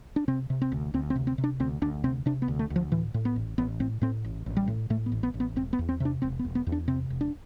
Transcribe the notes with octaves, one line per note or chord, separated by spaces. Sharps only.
D4
C3 C4
C3
C4
D2
D2 C4
C4
C3
C4
C3
D4
D2 C4
D2 D4
C3 C4
C3 D4
B3
D2
A3
D2
F3
A2 E3
A2
B3
A1
A1 B3
A2 C4
A2 C4
A1
A1
G3
A2
A2 A3
B3
A1
B3
A1
B3
E1 C4
B3
E2
C4
C3 D4
E1 C4
B3
E1
B3
E2
D4
C3 C4
E1
D4